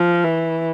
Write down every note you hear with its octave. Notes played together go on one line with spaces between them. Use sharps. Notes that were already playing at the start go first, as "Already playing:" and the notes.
Already playing: F3
E3